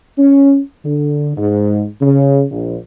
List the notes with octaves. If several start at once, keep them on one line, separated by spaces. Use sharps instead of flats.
C#4
D3
G#2
C#3
A#1